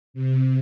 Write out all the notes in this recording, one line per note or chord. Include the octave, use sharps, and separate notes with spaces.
C3